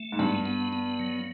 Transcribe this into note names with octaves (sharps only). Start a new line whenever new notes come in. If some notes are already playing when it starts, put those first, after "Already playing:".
Already playing: A3
G#2
G2 B3
B3
B3
F#3